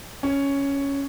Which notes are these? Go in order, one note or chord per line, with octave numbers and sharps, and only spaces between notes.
C#4